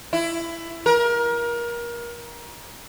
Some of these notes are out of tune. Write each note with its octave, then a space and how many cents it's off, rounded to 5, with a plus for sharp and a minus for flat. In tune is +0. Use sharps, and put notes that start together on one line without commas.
E4 +15
A#4 +25